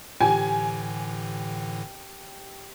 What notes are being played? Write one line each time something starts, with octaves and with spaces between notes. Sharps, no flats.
A2 D3 E3 G4 G#5